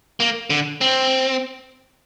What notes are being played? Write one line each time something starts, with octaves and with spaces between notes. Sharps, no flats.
A#3
D3
C4